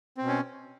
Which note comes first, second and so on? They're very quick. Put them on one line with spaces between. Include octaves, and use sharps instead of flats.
C4 B2 C#4